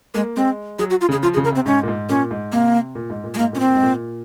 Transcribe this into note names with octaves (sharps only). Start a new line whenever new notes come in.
G#3 A#3
G#3 C4
F#3 G#4
F#4
F4
C#3 G#4
F3 F4
G#4
C#3
A#4
C3 C4
G#2 C#4
A#2
G#2
A#2 C#4
G#2
C3 A#3
A#2
G#2
A#2
G#3
G#2 A#3
A#2 C#4
C4
A#2
G#2
A#2